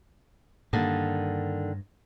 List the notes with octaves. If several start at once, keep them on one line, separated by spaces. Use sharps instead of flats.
G2 D3 D#3 A#3